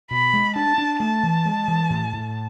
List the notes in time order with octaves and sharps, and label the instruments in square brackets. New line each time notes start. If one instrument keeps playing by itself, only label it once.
[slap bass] B2 [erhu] B5
[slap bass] G#3
[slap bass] D4 [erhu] A5
[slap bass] D4
[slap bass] A3 [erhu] A5
[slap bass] E3
G#3
E3
A2
A2